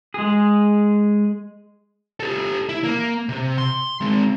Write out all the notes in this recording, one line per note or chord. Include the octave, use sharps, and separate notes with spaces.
G#3 G#4
G4 A4
E4
A#3
C3
C6
G#3 C4